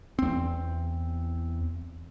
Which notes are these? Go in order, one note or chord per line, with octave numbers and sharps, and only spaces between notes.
E2 C4